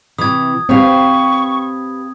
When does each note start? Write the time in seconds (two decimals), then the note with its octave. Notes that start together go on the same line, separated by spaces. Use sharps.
0.18 C3 E3 D#6 G#6
0.69 C4 G4 B4 F5 C#6